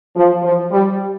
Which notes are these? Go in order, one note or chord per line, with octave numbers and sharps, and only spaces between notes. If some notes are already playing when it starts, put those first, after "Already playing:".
F3
F3
G3